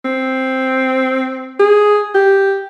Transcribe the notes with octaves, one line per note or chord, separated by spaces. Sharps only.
C4
G#4
G4